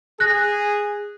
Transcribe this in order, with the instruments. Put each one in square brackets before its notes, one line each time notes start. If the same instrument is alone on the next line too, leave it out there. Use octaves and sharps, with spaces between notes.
[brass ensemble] G#4 [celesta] F#6 A#6